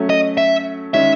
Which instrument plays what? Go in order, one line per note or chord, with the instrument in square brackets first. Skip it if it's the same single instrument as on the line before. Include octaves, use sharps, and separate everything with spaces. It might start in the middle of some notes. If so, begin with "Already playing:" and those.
Already playing: [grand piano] F#3 A3 C#4
[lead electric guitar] D#5
E5
[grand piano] D#3 G#3 C#4 [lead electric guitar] E5